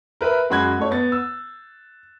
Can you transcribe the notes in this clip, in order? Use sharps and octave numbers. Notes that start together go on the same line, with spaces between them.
A#4 B4 E5 B5
F#2 G#3 F#4 B5 F#6 G#6
A3 C#5
B3 A6
E6